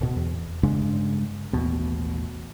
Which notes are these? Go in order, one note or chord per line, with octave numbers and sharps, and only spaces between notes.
D1 B2
E2
G2 C#3 G#3 D4
A1 D#2 B2